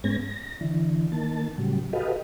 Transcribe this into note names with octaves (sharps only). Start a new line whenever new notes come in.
G#2 G#3 B3 C#4 G#6 A#6
A#6
D3 E3
D#3 A#3 A5
A2 C#3 F#3 G3
F#4 G4 A4 B4 D#5 F5